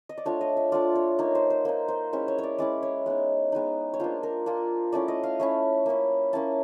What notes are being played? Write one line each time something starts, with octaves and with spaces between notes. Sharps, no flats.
D#5
D5
A3 D4 F4 C#5
D#5
E5
A3 D4 F4 D5
C#5
A#3 D#4 C#5
C5
C5
A#3 D#4 C5
C5
G#3 C#4 E4 C5
C#5
C#5 D5
G#3 C#4 E4 D5
C#5
G#3 B3 D#4
G#3 B3 D#4
C#5
A#3 D4 F4 C5
A#4
A#3 D4 F4
A3 C#4 E4 D5
D#5
F5
A3 C#4 E4
A#3 C#4 E4
A#3 C#4 E4 A5